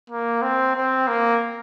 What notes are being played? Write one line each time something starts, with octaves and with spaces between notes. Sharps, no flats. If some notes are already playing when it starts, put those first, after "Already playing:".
A#3
C4
C4
A#3